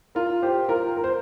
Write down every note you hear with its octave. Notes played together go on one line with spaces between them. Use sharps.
F4 A#4
G4 C5
F4 A#4
A#4
C5